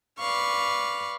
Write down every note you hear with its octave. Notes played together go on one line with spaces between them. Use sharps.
B4 D5 F5 C#6